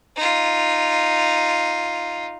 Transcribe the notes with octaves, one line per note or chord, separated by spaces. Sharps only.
D#4 F4